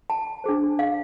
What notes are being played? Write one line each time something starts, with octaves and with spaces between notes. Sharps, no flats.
A5
D4 G#4 C5
F5